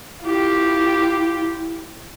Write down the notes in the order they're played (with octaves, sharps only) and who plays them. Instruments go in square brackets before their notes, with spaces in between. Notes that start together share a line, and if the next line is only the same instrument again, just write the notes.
[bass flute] E4 [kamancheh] F4 G4